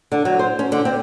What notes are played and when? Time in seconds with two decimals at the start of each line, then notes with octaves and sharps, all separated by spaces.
0.12 D3
0.25 F#3
0.39 C5
0.59 C#4
0.72 D3
0.85 C4